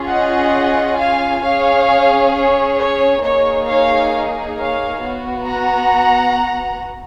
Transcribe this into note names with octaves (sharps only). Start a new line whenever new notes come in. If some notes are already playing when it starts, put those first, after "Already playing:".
Already playing: C#4 F4 G#4
D#5 F#5
F5 G#5
C#4 G#4 C#5 F5
C#5
C#5
A#3 D#4 G#4 C#5
C#5 F5
C#5 F5
B3 F#4
F#5 A#5